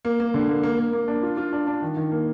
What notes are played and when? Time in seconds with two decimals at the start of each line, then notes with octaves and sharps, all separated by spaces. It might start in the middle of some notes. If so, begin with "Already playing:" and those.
0.05 A#3
0.20 A#3
0.34 D3
0.49 A#3
0.63 A#3
0.78 A#3
0.93 A#3
1.08 D4
1.23 F4
1.37 F4
1.53 D4
1.67 D4
1.82 D#3
1.97 D#3
2.12 A#3